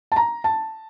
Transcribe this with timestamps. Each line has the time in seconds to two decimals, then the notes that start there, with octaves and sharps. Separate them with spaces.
0.12 A5
0.16 A#5
0.44 A5